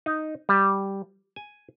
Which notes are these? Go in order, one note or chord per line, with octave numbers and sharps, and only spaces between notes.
D#4
G3
G#5